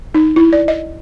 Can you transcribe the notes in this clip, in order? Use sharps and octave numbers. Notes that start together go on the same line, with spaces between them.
D#4
E4
D5
D#5